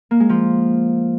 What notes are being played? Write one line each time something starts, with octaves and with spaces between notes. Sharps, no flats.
A#3
G#3
F3